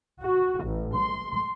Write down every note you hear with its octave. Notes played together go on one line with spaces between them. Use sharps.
F#4
A1
C6